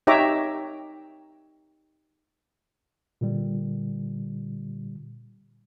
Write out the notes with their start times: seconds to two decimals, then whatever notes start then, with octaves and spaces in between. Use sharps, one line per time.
0.07 D#4 G4 C#5 E5 A#5 D6
3.21 A#2 D3 G3